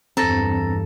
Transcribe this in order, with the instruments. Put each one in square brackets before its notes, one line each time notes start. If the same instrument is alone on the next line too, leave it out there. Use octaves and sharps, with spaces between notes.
[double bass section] E2 G2 [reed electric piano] C4 [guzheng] A4 [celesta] A#5 A6 A#6